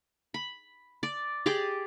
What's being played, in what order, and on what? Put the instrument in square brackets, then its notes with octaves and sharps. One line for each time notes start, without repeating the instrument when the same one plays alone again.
[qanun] B5
D5
G4 G#4 D5 D6